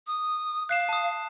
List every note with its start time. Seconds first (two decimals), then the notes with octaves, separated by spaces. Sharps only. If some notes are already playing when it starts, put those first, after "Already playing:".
0.07 D#6
0.69 F5 F#6 C7 E7
0.89 A5 D#6